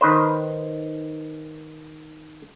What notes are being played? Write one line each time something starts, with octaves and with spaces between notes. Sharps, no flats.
D#3 B4 C5